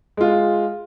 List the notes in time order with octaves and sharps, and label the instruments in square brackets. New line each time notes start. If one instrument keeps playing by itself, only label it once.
[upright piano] G#3 F4